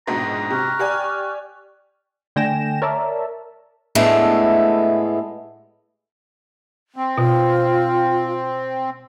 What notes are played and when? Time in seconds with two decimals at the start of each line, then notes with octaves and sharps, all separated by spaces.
0.07 A#1 G#2 B2 A#5
0.50 C3 C#6 F6 F#6
0.79 G4 D5 G#5
2.36 D3 A3 G5 G#5 A#6 E7
2.82 A#4 C#5 D5 E5 A5 A#5
3.95 A2 G#3 A3 B3 D4
6.96 C4
7.18 B2 F4